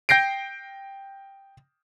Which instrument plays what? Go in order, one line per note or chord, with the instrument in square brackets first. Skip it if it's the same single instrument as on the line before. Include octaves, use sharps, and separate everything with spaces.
[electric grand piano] G5 G6 A#6 C7 D7